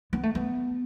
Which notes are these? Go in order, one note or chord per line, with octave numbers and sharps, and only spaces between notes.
B3
A3
B3